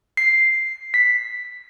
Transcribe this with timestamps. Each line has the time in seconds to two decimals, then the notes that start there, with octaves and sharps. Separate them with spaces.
0.17 C7
0.94 B6